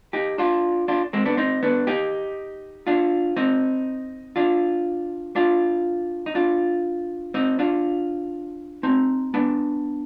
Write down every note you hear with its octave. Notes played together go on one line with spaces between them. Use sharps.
D#4 G4
D4 F4
D4 F4
G#3 C4
B3 D4
C4 D#4
B3 D4
D#4 G4
D4 F4
C4 D#4
D4 F4
D4 F4
D#4
D4 F4
C4 D#4
D4 F4
C4 D#4
B3 D4